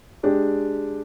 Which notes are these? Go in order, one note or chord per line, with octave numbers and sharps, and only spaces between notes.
G#3 D4 G4